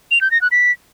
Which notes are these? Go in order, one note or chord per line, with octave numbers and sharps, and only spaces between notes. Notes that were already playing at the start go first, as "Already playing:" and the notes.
F7
G6
A#6
F#6
B6